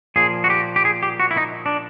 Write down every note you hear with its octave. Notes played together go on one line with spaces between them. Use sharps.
A#2 F3 G#4
F#4
G4
G4
G#4
G4
F#4
E4
D#4
D4